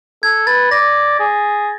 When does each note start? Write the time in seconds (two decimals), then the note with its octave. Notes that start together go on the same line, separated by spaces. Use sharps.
0.23 A4 G#6
0.47 B4 A6
0.71 D5 A#6
1.20 G#4